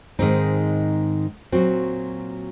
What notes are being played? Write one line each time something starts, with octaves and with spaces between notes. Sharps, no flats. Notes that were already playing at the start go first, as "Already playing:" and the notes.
G#2 D#3 G#3 C4 D#4
A#2 F#3 C4 F#4